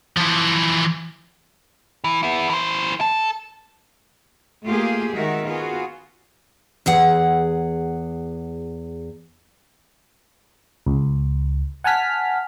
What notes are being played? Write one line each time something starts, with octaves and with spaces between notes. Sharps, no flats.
E3 F3
E3
B3 E4
E3 C5
A4
A3 A#3 F4 G4 G#4
D#3 G#3 F#4 A#4 E5
B3 F4 F#4 G#4
E2 G#4 F#5
C#2
F#5 G#5 A5 F6 B6